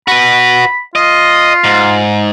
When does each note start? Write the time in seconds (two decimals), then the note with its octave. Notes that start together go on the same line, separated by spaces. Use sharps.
0.08 F#4 B4 B5
0.95 F4 D#5
1.64 G#2